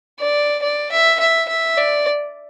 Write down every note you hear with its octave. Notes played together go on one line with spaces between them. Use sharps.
D5
D5
E5
E5
E5
D5